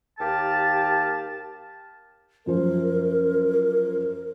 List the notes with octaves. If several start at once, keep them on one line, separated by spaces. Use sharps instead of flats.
D#2 G4 F5 A5
F#2 F3 A#4 C5